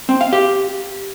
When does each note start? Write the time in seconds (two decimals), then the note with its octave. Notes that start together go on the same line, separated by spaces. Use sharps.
0.09 C4
0.21 F5
0.33 G4